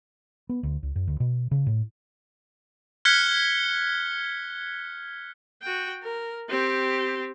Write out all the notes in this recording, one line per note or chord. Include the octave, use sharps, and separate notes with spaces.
B3
D2
C#2
F#2
D2
B2
C#3
A2
F6 F#6 G#6 B6 C#7 G7
F#4 G5
A#4
C4 G4